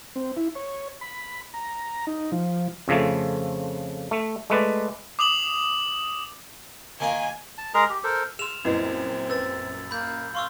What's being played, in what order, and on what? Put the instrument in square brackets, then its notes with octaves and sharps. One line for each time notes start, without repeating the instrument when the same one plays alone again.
[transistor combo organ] C4
E4
C#5
B5
A#5
D#4
F3
[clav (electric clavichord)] F2 C#3 F3 A3
A3
G#3 A3 B4 D5
[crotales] D6 D#6 F7 F#7
[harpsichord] D#3 A#3 F4 [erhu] G#5
[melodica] A5
G#3 G#4 A#4 A#5
G4
A4 A#4 C5
[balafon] G#4 C6 [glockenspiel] F6 E7 F7
[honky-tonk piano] A#1 F#2 [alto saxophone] C4 [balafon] E4 B4 D#5
[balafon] B4 [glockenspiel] E6 A6
[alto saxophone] A#3 [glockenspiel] B5 G6
[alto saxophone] F5 [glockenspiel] C6 C#6 E6